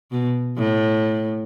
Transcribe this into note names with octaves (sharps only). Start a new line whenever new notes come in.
B2
A2